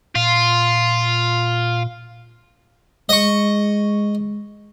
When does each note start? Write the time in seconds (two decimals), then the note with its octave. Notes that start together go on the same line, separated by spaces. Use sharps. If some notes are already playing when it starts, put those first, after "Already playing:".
0.15 A#2 F4
3.09 G#3 D#5 C#6